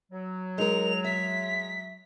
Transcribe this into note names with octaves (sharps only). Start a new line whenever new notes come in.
F#3
G#3 D#4 A#4 F7
E5 B6